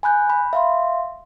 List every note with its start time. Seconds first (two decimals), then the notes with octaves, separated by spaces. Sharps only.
0.03 G#5 B5 F#6 G6
0.30 B5
0.53 E5 F5 C6